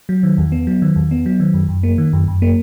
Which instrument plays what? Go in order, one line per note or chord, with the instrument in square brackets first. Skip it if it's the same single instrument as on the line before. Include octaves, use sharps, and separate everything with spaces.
[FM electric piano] F#3
D#3
E2
B3
F#3
D#3
E2
B3
F#3
D#3
F#2
F#2
A#3
D#3
F#2
F#2
A#3